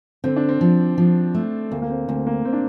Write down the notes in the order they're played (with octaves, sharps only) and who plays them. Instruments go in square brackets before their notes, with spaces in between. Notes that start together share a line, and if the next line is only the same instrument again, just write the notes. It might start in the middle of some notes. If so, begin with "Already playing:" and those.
[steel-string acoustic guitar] D3 [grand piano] C4
[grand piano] D4
C4
[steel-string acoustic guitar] F3
F3
A3
[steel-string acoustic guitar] D2 [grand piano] A#3
[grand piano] A#3
C4
[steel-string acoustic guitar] D2 [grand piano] C4
[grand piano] A#3
C4
D4